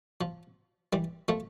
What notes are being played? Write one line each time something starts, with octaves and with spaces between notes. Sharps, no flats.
F3
E3 G3
F3 A3